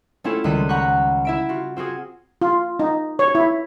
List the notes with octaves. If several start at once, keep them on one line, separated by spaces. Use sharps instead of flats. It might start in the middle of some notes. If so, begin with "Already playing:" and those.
A3 C4 C#4 E4 F4 A4
C#2 D#3 G3 F#6 B6 D#7
F#5 A#5 B5 C#6 F#6 G6
E4 E5 D7
F4 F#4
C4 F4 F#4 G#4
F4
D#4
C#5
E4